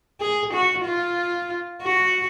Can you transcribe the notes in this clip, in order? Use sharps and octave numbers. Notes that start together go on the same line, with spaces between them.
G#4
F#4
F4
F#4